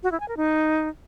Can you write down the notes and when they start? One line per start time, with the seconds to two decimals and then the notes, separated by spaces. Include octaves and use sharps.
0.03 F#4
0.12 E4
0.20 G#5
0.28 A#4
0.37 D#4